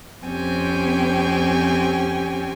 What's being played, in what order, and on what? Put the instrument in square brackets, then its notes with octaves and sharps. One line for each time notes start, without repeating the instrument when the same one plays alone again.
[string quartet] F2 C4 C#4 G4 G5 G#5